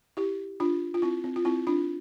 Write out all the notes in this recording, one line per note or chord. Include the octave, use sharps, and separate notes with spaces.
E4 G4
D4 F4
F4
C4 E4
C4
F4
C4 E4
D4 F4